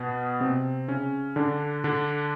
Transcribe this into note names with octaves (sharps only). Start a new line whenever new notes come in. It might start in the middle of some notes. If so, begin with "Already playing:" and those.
Already playing: B2 B3
C3 C4
C#3 C#4
D3 D4
D3 D4